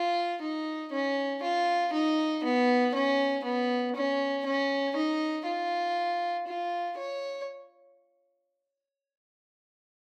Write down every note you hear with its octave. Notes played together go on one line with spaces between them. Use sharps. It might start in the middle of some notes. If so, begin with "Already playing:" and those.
Already playing: F4
D#4
C#4
F4
D#4
B3
C#4
B3
C#4
C#4
D#4
F4
F4
C#5